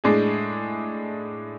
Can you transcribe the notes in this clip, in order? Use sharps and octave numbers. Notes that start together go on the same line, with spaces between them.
A2 G#3 D4 G#4